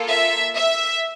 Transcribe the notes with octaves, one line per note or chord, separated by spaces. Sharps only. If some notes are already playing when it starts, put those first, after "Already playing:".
Already playing: A#3 F4 A4
E5
E5